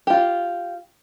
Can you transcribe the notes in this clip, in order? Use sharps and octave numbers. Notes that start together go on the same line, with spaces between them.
F4 G4